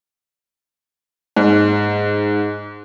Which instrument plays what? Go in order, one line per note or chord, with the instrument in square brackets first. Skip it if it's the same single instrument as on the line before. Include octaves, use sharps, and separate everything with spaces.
[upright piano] G#2